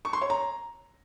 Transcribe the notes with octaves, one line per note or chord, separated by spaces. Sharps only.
C#6
C6
C#5
A#5